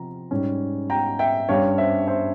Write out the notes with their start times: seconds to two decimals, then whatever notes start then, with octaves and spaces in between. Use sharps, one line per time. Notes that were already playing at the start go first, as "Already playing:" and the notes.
Already playing: C3 F3 A#5
0.31 G#2 G3 C#4
0.90 G5 A#5
1.19 E5 G5
1.49 G2 G3 C#4 C#5 F5
1.78 C5 E5
2.07 C5 E5